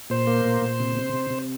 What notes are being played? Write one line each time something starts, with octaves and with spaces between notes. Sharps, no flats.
A#2 C5
A#3
A#2
A#2
C3
C3
C3
C3